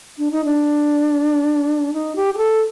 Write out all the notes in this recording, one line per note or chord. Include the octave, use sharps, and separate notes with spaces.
D4
D#4
D4
D#4
G4
G4
A4